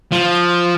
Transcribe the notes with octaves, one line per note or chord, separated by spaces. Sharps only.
F3